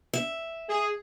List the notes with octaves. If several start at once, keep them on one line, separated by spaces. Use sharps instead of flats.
E5
G#4